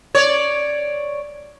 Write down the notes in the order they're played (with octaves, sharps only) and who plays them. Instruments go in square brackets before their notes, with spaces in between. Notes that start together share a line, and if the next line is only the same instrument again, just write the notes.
[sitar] C#5 D5